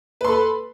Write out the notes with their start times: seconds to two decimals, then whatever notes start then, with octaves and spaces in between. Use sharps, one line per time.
0.21 B4
0.25 C6
0.28 A4
0.32 B5